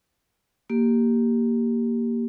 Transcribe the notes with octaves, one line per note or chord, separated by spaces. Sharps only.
A#3 G4